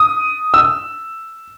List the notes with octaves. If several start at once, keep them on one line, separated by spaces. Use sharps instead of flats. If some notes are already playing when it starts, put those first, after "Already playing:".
Already playing: D#6
E6